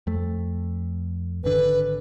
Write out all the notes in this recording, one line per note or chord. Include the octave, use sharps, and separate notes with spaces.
F2 A3
G#1 D3 B4